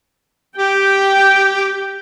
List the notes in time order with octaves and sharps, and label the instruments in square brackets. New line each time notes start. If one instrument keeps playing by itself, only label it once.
[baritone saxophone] G4 [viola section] G5